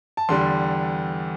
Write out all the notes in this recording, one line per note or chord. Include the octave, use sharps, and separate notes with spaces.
A5
E2 D3 G3 C6